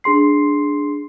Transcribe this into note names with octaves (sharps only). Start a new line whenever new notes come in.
D4 G#4 C6 C7